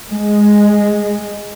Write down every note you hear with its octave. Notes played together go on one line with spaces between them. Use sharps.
G#3